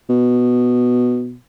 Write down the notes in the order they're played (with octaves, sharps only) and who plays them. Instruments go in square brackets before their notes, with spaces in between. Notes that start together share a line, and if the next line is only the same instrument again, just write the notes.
[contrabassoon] B2